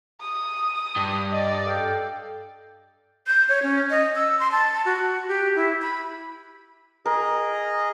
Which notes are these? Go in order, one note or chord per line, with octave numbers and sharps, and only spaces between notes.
D#6
G2
D5 D#5
A4 F5 G5
G6
C#5
C#4
D#5
E6
C6
A5
F#4
G4
E4
B5
G#4 A#4 D#5